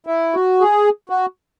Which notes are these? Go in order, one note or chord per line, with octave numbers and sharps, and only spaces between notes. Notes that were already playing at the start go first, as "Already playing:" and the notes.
E4
F#4
G#4
F#4